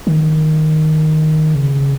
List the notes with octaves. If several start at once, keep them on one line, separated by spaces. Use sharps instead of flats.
D#3
C#3